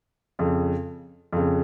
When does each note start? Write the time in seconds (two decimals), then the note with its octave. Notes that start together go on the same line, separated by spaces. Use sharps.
0.39 F2 C#3
1.33 F2 C#3